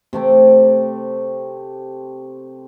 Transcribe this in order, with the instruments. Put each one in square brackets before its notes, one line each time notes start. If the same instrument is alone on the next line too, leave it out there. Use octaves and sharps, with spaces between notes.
[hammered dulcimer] C3 A3 C4 D6